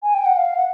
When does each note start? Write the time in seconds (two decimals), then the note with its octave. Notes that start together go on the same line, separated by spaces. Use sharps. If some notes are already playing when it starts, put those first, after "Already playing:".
0.03 G#5
0.14 G5
0.26 F#5
0.37 F5
0.57 F#5